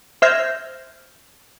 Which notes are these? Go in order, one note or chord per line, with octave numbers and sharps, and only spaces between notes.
C5 E5 F6 G6 G#6 A#6